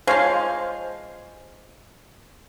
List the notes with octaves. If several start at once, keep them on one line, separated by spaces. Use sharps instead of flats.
F3 G#3 C5 C#5 F5